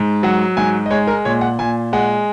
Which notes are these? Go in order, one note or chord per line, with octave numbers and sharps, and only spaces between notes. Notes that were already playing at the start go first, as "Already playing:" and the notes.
Already playing: G#2
F#3 F#5
G#2 G#5
D#5
G#3 C#5
A#4
A#2 C#5
F#5
A#2 G#5
G#3 F#5